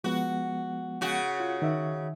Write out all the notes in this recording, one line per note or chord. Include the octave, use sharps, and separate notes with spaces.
F3 G#3 B3 F#4
C#3 F#4
F4
D#3 D#4 E5